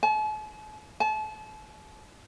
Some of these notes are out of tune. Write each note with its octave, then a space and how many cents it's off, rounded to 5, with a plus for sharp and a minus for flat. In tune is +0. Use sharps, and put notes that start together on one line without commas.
A5 -45
A5 -35